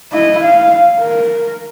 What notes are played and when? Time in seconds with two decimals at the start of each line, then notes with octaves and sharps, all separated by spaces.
0.13 E4 D#5
0.44 F5
1.00 A#4